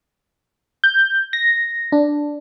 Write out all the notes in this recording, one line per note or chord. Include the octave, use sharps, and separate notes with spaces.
G6
A#6
D4